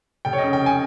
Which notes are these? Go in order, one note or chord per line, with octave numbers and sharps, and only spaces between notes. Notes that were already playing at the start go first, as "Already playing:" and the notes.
F1 G5
C#5
D#5
C#3
G5
G#5